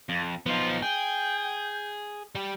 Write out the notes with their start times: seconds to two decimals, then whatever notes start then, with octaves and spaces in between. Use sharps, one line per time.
0.09 F2
0.46 F3 B3 D#4 F4
0.83 G#4 G5
2.35 G3 G4